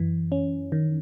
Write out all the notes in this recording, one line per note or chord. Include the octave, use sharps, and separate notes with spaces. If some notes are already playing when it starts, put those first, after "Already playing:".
Already playing: F#2 E3
C#4
D#3